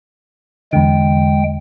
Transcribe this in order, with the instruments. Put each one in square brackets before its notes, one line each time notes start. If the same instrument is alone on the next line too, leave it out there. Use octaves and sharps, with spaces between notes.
[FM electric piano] E2 D3 [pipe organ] G#3 G5